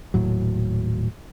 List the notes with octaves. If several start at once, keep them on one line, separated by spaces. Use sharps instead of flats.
D#1 A2 F#3